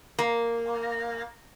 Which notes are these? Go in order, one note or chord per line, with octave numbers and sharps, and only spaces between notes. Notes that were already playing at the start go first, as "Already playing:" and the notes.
A#3